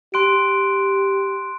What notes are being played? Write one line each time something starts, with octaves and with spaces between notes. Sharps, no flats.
G4 C6 F#6 D7